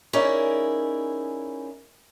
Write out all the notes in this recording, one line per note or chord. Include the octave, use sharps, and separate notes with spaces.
C#4 D#4 E4 G#4 A#4 D5